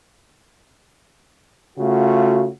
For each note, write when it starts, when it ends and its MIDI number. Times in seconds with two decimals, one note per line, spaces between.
1.78 2.49 49
1.78 2.49 57
1.78 2.49 65
1.78 2.46 66